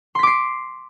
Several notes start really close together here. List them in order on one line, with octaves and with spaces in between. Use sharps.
C6 B6 D6 C7